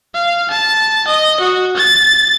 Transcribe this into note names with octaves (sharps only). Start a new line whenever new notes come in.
F5
A5
D#5
F#4
A6